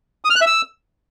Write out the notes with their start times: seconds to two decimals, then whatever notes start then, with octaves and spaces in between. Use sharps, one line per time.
0.25 D#6
0.30 F6
0.36 F#6
0.41 E5
0.46 E6